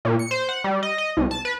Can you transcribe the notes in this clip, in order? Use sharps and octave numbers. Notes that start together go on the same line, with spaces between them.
A#2
C#7
C5
F#5
G3
D#5
D#5
C2
A5
B4